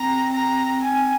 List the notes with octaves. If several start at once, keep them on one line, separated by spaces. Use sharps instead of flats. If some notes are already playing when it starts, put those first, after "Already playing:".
Already playing: C4 A#5
A#5
G#5